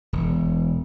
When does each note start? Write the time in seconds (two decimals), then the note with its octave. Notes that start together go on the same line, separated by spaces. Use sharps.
0.13 E1